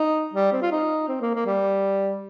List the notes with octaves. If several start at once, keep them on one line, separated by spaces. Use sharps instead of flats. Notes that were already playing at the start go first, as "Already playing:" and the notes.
Already playing: D#4
G3
C4
F4
D#4
C4
A#3
A#3
G3